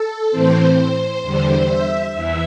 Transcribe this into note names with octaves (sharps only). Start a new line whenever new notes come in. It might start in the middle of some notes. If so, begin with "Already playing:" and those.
Already playing: A4
A2 E3 C4 C5
E2 D3 G3
E5
E2 E3 E5